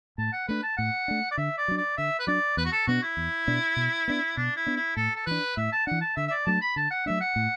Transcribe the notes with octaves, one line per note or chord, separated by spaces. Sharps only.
A2 A5
F#5
A3 D4 B4
A5
A2 F#5
A3 D4
D5
D3 E5
D5
F#3 D4
D5
D3 E5
B4
F#3 D4 D5
E2 B4
F#4
A4
B2 B3 D4 F#4
E4
E2
B2 B3 D4
B2
B3 D4
B2 D4
E4
B3 D4
E4
A2 A4
A4
E3 D4 B4
A2 E5
A5
E3 D4 F#5
A5
D3 E5
E5
D5
F#3 A3 D4 A5
B5
D3 A5
F#5
F#3 A3 D4 E5
F#5
A2